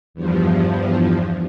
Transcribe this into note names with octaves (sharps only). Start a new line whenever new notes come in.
E2 G2 F3